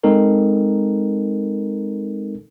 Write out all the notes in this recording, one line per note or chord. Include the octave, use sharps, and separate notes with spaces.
G#3 C4 D#4 A4 A#4